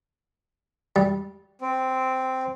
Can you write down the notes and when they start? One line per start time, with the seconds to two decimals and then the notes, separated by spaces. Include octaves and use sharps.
0.96 G3
1.61 C4